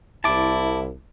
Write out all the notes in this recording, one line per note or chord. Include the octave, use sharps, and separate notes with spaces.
C2 E4 A5 D6